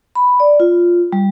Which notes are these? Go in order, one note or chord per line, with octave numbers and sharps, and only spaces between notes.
B5
D5
F4
G3